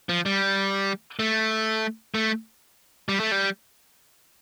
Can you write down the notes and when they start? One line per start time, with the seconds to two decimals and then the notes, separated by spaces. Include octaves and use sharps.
0.09 F3
0.26 G3
1.19 A3
2.15 A3
3.09 G3
3.20 A3
3.32 G3